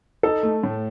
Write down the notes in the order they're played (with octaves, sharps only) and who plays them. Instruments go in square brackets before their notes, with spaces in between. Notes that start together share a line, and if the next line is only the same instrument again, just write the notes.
[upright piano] D#4 [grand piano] A4
[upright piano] A3
A2